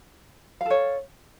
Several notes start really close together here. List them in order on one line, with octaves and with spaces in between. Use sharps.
F5 A4 C#5